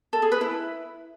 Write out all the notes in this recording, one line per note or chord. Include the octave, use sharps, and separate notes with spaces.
A4
G#4
B4
E4